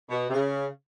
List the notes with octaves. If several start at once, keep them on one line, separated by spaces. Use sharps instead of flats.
B2
C3
C#3